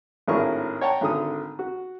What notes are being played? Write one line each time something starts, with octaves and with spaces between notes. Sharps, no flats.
G#1 A2 D4 G#4 A#4 C#6
C#5 F#5 G5 A5 A#5
G#1 D3 D#6
F#4